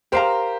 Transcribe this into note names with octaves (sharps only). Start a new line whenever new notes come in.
G4 A#4 C5 F5 A#5